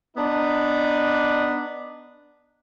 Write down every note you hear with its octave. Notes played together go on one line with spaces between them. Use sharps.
B3 D4 D#4